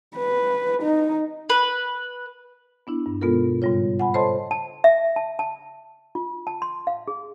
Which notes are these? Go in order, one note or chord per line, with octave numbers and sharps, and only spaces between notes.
B4
D#4
B4
B3 D4 E4
G2
B2 G#3 B3 F4 A4 A#4
G#2 C#3 G3 F4 C#5
F#5 G#5 B5
A4 C5 C#5 D#5 A5 C6
A5
E5
A5
A5
F4
A5
C6
F5
G#4